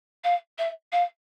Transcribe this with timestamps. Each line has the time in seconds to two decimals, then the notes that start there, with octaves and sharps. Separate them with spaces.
0.24 F5
0.59 E5
0.92 F5